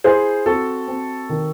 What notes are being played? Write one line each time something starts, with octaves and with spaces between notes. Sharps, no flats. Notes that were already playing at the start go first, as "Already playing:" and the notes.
E4 G#4 C5
C4 F#4 A4
C4
D#3